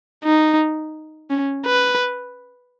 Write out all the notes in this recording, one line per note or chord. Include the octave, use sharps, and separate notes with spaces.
D#4
C#4
B4